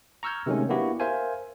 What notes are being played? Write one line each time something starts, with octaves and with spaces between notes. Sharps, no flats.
A#5 C#6 E6 F6 G6 G#6
C3 D#3 F#3 G#3 A3 C#4
A#3 B3 D4 E4 F#4 G4
A#4 C5 E5 F5 G#5